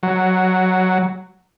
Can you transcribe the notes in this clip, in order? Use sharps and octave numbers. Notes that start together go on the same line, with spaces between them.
F#3